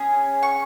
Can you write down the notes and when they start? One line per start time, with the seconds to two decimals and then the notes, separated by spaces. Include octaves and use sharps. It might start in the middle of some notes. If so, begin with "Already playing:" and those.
Already playing: C#4 G#4
0.43 C#6